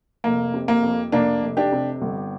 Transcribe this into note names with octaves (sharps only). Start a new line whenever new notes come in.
F1 A#3
C3
A#3
F2
F1 A#3 D4
F1
D4 G4
C3
G1